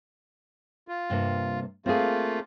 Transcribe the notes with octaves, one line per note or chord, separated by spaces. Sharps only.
F4
G2 C3 A#3
A3 A#3 C4 F4 G#4